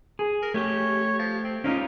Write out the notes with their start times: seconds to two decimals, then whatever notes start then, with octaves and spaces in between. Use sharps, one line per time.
0.19 G#4
0.42 A#4
0.54 A3 G4 C#5
1.19 F3
1.44 C4
1.64 A#3 C#4 D#4 F4